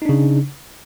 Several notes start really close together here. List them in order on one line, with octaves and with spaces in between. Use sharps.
D#4 D4 C#3